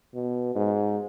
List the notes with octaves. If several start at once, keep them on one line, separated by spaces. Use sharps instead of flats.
B2
G#2